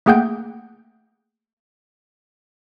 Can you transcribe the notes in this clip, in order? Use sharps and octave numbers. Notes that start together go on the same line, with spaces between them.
A3 A#3 G#4 F#5 G5 G6